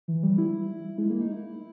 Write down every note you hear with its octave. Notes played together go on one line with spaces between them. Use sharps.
E3
G3
E4
G#3
A#3
D#4
E4